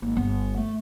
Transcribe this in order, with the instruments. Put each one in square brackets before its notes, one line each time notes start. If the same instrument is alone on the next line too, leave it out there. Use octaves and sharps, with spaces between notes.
[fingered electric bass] G#1 [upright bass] A#3
[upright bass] G1 [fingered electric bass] B3
[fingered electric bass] A3